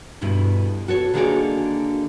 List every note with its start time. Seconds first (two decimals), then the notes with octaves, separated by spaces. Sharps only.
0.21 D2 G2 B2 E4
0.88 F#4 A4 C#5
1.14 D3 D#3 A#3 F#4 G#4 D5